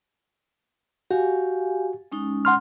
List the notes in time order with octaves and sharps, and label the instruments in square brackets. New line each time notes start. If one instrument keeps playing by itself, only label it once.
[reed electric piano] F#4 [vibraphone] G4 F5 G#5
[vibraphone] G#3 C#4 D#4
[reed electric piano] F#5 C6 F6